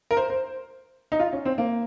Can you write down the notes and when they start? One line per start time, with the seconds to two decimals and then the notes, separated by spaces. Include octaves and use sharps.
0.11 A#4
0.17 C5
0.30 C5
1.12 D#4
1.20 F4
1.33 C#4
1.45 C4
1.58 A#3